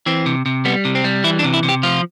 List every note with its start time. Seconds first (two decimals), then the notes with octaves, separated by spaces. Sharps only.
0.06 E3 C4
0.26 C3
0.46 C3
0.65 G3 B3
0.85 C3
0.95 C4
1.04 G3
1.24 E3 E4
1.39 D4
1.44 C3
1.54 E4
1.63 C3
1.69 G4
1.83 F3 F4